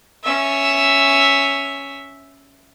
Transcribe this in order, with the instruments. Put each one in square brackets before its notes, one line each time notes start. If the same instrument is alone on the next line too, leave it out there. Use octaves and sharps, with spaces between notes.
[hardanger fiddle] C#4 E5